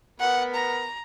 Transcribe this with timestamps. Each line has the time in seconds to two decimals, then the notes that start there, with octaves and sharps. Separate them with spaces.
0.20 B3 A#4 F#5 B5
0.54 A#5